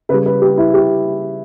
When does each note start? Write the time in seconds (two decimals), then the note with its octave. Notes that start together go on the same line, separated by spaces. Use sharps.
0.09 C#3 G3 B4
0.26 B4
0.41 G4
0.58 E4
0.74 G4